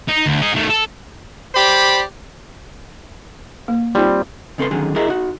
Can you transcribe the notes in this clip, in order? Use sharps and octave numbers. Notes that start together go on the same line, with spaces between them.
D#4
D2
D#4 G#4
D#3 A3
A4
G4 C5 D5 B5
A#3
G3 C4 D#4 F4 C6
C#3 C4 A4 B4 C6
F#2 D3 D#3 G#4
E4 F#4 G#4 A#4 D#5 E5
D#4 F#4